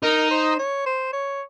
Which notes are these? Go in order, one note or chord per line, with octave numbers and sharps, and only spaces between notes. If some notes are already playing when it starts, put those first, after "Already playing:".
D#4 A#4
C5
C#5
C5
C#5